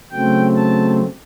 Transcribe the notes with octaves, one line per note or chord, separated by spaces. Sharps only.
C#3 F#3 A3 C4 G5
A5